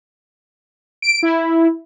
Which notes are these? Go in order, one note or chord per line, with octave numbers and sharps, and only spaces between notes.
D7
E4